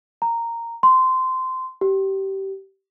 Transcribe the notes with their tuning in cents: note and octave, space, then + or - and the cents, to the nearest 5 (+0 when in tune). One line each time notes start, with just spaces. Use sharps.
A#5 -10
C6 -15
G4 -20